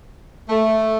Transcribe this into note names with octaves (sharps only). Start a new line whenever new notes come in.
A3